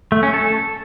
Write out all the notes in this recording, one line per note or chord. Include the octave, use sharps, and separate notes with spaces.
A3
C#4
A4